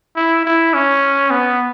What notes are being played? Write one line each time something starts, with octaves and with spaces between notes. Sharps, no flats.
E4
E4
C#4
B3